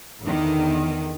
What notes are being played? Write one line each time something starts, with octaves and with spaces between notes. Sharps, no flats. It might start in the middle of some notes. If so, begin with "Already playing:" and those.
E2 D3 D#3